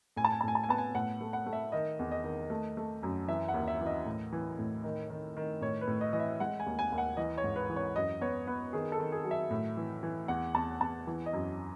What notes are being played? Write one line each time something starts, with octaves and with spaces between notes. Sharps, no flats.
A2 G#5
A5
G#5
A5
A2 G#5
A5
G#5
B3 A5
G#5
A2 F#5
A3
F#5
A3
E5
D#3 D#5
E2
D#5
D#3
A3
A3
F#2
E3 E5
F#5
D#2
E5
E3
D#5
A2
E3
A2
D#3
D#3
D#3
A2 C#5
B4
A2
D#5
E3 D#5
E5
G#3 F#5
G#5
D#2
G#5
D#2
F#5
E3 D#5
C#5
G#2
B4
E3
C#5
F#2 D#5
B3 C#5
B3 B4
D#3 G#4
A4
D#3
G#4
F#3
E5
A2
E3
E3
E2 F#5
E2 A5
E2 A5
E3
D#5
F#2